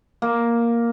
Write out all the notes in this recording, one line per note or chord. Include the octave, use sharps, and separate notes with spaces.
A#3